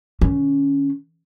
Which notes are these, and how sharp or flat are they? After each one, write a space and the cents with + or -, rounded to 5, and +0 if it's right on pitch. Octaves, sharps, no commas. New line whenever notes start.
D#3 -35 C#4 +10